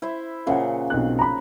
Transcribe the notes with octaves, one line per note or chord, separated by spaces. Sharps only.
E4 C5 E5
A#2 C#3 F3 E5 F#5
B1 C4 F#6
A#5 B5